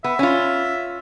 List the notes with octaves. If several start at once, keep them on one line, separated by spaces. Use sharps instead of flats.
B3 E5
C#4 F4